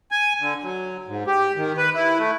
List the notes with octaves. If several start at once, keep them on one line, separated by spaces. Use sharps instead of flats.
G#5
D3
F#3
G#2
G4
D#3
B4
E4
A3